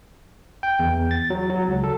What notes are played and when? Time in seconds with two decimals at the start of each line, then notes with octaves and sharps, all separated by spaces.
0.63 G5
0.79 E2
1.11 A6
1.30 F#3
1.50 F#3
1.68 C#2
1.84 A4